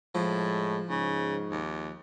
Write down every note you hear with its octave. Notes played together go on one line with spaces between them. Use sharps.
A2 F3 G#3
G#2 C#3
D#2